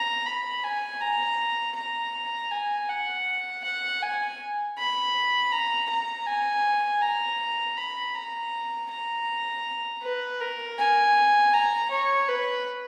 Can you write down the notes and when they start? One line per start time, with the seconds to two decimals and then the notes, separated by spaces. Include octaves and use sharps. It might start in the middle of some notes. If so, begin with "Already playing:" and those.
Already playing: A#5
0.26 B5
0.64 G#5
1.01 A#5
1.75 A#5
2.51 G#5
2.89 F#5
3.64 F#5
4.02 G#5
4.77 B5
5.52 A#5
5.90 A#5
6.26 G#5
7.02 A#5
7.77 B5
8.14 A#5
8.90 A#5
10.03 B4
10.41 A#4
10.78 G#5
11.54 A#5
11.91 C#5
12.29 B4